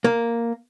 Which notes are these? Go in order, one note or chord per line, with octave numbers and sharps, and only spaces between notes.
A#3